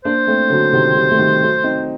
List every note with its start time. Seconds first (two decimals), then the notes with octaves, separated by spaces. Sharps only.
0.05 A#3 D4 C5
0.27 A3 C4
0.50 D3 F#3
0.73 C3 D#3
0.95 D#3 G3
1.11 A3
1.18 D#3 G3
1.42 F#3 A3
1.64 C4 D#4